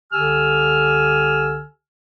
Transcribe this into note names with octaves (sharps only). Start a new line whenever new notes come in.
C2 D3 G4 G#5 E6 F6